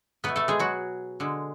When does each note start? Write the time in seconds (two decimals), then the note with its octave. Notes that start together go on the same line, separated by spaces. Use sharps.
0.24 B2 A3 B3 B4
0.36 A3 A4
0.48 G#3 G#4
0.59 F#3 F#4
1.20 D3 G#3